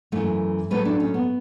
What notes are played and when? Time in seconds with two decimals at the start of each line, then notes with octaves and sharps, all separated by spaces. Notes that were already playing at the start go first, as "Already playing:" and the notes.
0.12 F#2 E3 A3
0.71 A2 F#3 A3 B4
0.85 D4
1.00 C#4
1.14 B3